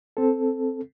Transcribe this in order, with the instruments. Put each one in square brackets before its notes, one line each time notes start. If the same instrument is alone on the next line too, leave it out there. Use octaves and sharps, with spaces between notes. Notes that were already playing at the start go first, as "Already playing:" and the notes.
[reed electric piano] C4 A4